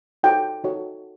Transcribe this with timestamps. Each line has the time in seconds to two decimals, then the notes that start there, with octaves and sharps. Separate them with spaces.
0.23 D#4 F#4 A4 C#5 G5
0.64 D#4 F#4 A4 C#5